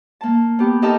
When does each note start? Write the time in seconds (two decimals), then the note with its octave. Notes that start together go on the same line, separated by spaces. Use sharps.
0.21 A#3 A5
0.59 B3 G4
0.82 D#4 G4 A4 A#4 D#5 A5